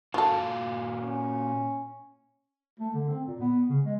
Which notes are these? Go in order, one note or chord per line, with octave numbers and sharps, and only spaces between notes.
A#2 F4 F#4 A4 F5
C#4
A3
D3
C4
A#2
B3
C#3
G#3